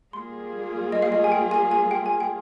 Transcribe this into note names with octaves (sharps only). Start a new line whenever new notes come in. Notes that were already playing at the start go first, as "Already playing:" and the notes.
G3 A#3 F4 G#4 C6
D#5
F5
D#5
G#5
G5
G#5
G#5
G5
G#5
G5